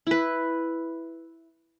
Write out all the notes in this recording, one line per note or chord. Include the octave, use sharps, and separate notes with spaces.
E4 B4